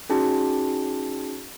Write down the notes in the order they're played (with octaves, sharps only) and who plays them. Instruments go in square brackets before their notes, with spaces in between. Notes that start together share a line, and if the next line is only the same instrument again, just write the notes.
[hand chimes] C#4 D#4 F#4 G#4 A5